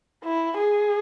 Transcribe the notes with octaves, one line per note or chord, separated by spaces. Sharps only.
E4
G#4